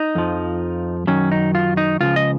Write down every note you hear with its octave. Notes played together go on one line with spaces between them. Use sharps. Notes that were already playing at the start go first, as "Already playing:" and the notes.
Already playing: D#4
F2 F3
F#2 D#3 F#3 C#4
D#4
F4
D#4
C#2 C#3 F3 F4
D#5